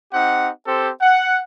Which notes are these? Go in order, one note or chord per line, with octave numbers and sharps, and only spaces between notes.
C4 D#4 G4 F#5
C4 G4 A4 C5
F#5